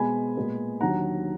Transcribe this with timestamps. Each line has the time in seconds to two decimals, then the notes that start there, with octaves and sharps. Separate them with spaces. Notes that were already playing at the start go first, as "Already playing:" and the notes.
Already playing: B2 G#3 B3 G#5 B5
0.37 A#2 G#3 B3
0.81 D#2 D3 F#3 F#5 A#5